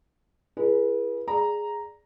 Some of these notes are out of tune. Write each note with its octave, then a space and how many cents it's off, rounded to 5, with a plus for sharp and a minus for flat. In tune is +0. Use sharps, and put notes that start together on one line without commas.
E4 +45 G#4 +0 B4 -35
G#4 +0 D5 +0 A#5 +0